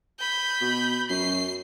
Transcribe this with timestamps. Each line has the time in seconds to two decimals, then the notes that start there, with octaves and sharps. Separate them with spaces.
0.19 B5 G6
0.61 B2
1.10 F#2 C7